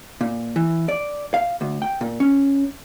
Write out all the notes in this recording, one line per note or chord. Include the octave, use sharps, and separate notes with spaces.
A#2
E3
D5
F5
D2
G5
A#2
C#4